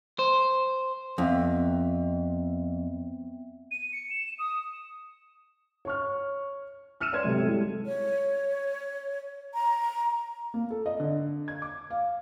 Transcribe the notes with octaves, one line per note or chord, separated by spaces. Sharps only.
C5
F2 B3 C4 E5
D#7
C#7
E7
D#6
C#5 C#6 F6
E6 F6 C#7 D#7 E7
B4 C#5 D5 C6 F6 G#6
B1 G#2 C3 G4 A4
G3 G#3 E4 G4 A4
C#5
A#5
A#3
A4
D#5
D3
G#6
D6
F5